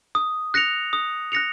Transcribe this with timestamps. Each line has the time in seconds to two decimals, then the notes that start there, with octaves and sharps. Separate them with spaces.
0.15 D#6
0.54 F#6 A#6 C#7 F7
0.93 D#6
1.32 F#6 A#6 C#7 F7